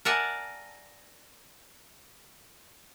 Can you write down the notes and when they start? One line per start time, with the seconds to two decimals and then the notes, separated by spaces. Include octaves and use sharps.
0.05 A#4 D5 E5 F#5 G#5 A5